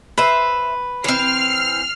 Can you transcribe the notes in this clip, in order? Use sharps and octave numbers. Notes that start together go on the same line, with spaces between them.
B4 C5 E5
E3 C4 F6 C7